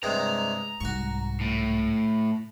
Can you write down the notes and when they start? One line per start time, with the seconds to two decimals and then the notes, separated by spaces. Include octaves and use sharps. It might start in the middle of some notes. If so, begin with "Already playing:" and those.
0.03 G2 C3 G#3 A#5
0.81 C2 G#2 F#4 C#6
1.41 A2